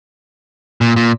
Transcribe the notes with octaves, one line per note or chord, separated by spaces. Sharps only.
A#2
A#2